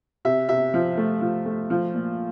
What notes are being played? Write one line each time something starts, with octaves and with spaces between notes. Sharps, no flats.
C3 E5
C3 E5
F3
A3
F3
A3
F3
A#2